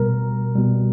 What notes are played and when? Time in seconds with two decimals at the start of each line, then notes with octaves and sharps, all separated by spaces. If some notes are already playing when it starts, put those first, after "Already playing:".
Already playing: B2 G3 A#4
0.56 B2 G3